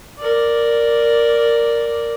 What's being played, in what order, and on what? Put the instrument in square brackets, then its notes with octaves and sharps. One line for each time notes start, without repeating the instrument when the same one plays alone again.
[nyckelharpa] A#4 D5